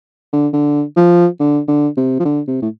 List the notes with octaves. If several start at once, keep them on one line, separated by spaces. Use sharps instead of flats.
D3
D3
F3
D3
D3
C3
F3
D3
C3
A2